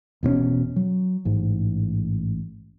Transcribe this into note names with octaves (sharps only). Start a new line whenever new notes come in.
E1 B2 B3 C#4
F#3
A1 G#2